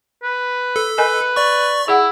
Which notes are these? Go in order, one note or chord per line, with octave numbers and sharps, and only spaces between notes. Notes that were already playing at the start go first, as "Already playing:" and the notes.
B4
A4
A#4 B4 D#5 G#5
D5 C#6
E4 G#4 F#5